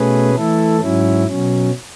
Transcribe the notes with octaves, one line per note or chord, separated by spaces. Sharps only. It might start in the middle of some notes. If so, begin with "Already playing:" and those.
Already playing: B2 A3 C#4 G#4 B4
E3 A3 E4 A4
G#2 F#3 C#4 E4
B2 F#3 C#4